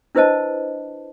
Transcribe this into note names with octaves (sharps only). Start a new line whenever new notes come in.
D4 E4 B4 C5 D#5 A5